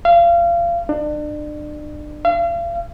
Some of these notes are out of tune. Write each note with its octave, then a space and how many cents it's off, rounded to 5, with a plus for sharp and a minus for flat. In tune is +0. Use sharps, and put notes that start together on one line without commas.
F5 -30
D4 +35
F5 -40